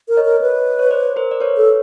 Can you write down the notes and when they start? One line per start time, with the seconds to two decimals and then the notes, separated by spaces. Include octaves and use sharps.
0.09 A#4
0.17 C#5 D#5
0.25 A#4
0.41 B4
0.79 C#5
0.91 C5 D5
1.16 A#4 C5
1.31 D5
1.40 B4 C#5
1.57 A4